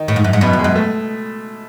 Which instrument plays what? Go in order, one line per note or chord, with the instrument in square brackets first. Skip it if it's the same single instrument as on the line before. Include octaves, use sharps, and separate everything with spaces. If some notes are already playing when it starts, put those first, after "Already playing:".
Already playing: [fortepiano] D#3 D#4
[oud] A2
G#2
F#2
G#2
[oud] F#2 [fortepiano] B2 B3
[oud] E2
[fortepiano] G#3
[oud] F#2
[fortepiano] A3